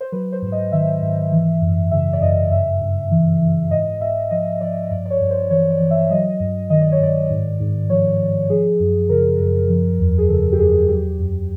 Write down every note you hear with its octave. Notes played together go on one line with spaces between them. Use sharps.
C5
F#3 B4
C5
G#2
D#5
D#3 E5
G#2
E3
F#2
C#3 E5
D5
F#2 D#5
G2 E5
G2
E3
E3
G#2 D#5
G#2 E5
F3 D#5
F3 D5
G2 D5
D5
C#5
G2
C5
E3 C#5
D5
E3
E5
F#3 D#5
G2
D#3 D#5
D5
C#5
G2 D5
G#2
G#2
F3 C#5
F3
F3 G#4
F#2
C#3 A#4
F#2
F3
E2
G#4
C#3 A4
G4
E2 G#4
F#3 G4
F#2